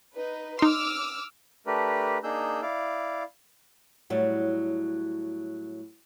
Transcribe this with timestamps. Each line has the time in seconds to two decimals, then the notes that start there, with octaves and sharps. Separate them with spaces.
0.13 D#4 B4
0.59 D#4 C6 D6 E6 F6
1.67 A3 D4 G4 A#4 B4
2.24 A#3 D4 D#4 G#4 E6 G6
2.62 E4 D5 F5
4.10 A2 F#3 G3